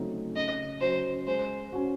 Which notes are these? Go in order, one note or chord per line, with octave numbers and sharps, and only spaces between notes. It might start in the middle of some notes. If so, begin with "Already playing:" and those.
Already playing: C#3 F#3 A3 C4 D#4
C#3 D#5
F#3 C#4 F#4 C5
G#3 C5
C#4 F#4